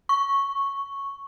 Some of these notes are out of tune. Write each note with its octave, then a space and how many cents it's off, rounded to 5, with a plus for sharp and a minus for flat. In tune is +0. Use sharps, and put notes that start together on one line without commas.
C#6 -5